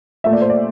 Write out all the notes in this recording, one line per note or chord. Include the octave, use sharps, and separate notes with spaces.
A#2 A3 E5
D5
C5
D5